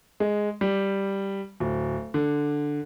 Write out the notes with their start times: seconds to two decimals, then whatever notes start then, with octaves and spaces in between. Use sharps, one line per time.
0.20 G#3
0.61 G3
1.60 D1
2.14 D3